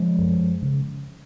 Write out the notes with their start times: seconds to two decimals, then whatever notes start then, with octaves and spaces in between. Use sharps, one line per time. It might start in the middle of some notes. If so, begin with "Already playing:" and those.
Already playing: F3 G#3
0.18 F#2
0.62 C#3